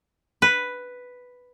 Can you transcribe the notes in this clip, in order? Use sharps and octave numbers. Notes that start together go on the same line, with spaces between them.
B4